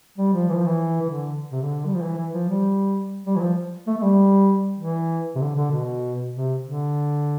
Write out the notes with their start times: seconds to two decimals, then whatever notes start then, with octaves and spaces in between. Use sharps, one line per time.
0.18 G3
0.34 F3
0.49 E3
0.57 F3
0.66 E3
1.02 E3
1.11 D3
1.52 C3
1.62 D3
1.86 G3
1.95 F3
2.03 E3
2.18 E3
2.34 F3
2.49 G3
3.26 G3
3.36 E3
3.41 F3
3.87 A3
3.98 A3
4.03 G3
4.79 E3
5.35 C3
5.41 D3
5.56 D3
5.71 B2
6.34 C3
6.63 D3